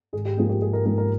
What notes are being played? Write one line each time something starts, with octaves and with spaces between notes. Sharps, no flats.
G#1 G#4
G4
G#2 F3 A#3 G#4
G4
G#1 G#4
A#4
G#2 F3 A#3 A#4
A#4